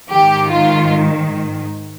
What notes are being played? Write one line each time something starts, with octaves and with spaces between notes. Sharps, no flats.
G#2 D#3 G4
F4